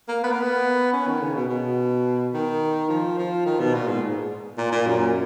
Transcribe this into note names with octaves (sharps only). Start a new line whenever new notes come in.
A#3
B3
A#3
B3
C#4
D#3
C#3
B2
B2
D#3
F3
F3
D#3
B2
A#2
G#2
A#2
A#2
F#2